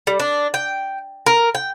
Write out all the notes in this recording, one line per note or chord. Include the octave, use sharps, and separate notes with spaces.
G3
D4
G5
A#4
G5